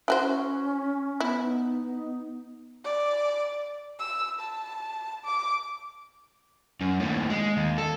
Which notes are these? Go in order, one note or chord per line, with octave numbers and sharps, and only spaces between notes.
E4 F#4 C5
C#4
B3 E4
D#4
D5
E6
A5
D6
F#2
D#2 A2
G#3
D#2
A4